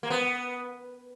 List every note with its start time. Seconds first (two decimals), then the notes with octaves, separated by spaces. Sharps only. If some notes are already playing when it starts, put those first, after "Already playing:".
0.03 A#3
0.10 B3